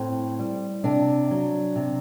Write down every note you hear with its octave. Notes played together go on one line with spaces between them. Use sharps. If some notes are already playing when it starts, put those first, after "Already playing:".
Already playing: A2 C4
G3
C3 D4
F#3
C3